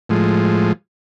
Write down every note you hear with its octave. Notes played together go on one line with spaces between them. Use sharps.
A2 F3 G#3